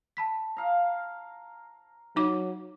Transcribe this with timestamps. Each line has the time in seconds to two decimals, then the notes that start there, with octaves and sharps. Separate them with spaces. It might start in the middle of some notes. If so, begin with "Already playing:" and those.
0.17 A5 B5 B6
0.57 F5 A#5
2.16 F#3 D#4 D6